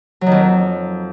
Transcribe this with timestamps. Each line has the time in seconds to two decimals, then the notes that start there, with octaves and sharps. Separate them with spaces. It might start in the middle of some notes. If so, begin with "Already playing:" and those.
0.21 F#3
0.26 D#3
0.32 F2